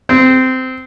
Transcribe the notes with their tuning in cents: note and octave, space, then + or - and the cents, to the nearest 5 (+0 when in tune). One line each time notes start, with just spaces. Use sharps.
C4 -15